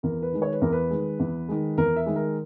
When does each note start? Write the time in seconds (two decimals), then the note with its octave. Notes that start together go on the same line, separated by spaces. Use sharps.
0.03 E2 A#4
0.22 B4
0.32 D#3 G#3
0.42 C#5
0.52 B4
0.61 E2 A#4
0.72 B4
0.90 D#3 G#3
1.19 E2
1.48 D#3 G#3
1.77 E2 A#4
1.96 E5
2.06 D#3 G#3
2.16 A#4